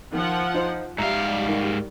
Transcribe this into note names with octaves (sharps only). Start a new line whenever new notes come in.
D#3 F3 F#5
D#4 C5
G#2 G3 E5 F5 A#5
D#3